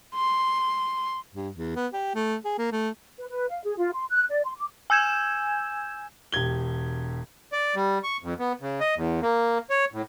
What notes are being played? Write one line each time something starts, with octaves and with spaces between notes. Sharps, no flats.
C6
G2
E2
B3
G4
A3
G#4
A#3
A3
B4
B4
F5
G#4
F4
C6
F#6
D5
C6
D6
G#5 E6 G6 G#6 E7
E1 G4 G#6 G7
D5
G3
C#6
F2
B3
C#3
D#5
E2
A#3
C#5
A2